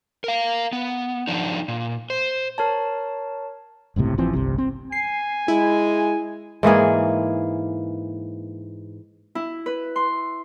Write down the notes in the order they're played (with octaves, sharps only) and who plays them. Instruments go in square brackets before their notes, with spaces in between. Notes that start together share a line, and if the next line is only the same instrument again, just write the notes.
[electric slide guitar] A#4 F5
B3
F3 F#3 D4 D#4
A#2
C5
[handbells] A#4 C#5 A5
[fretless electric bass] G1 C#2 A2 C3
A1 E3 F3 C4
G1 C2 C3
C4
[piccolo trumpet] G#5 [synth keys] C7
[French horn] G#3 [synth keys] E4
[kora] G#2 E3 A#3 G#4
[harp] E4
B4
C6